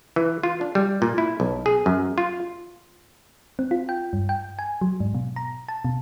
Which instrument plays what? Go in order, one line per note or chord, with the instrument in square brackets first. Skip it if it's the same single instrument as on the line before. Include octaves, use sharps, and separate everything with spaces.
[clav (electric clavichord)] E3
F4
D4
G3
A#2
E4
B1
G#4
F#2
F4
[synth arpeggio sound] C4
F4
G5
G2
G5
G#5
F#3
G#2
B2
A#5
A5
B2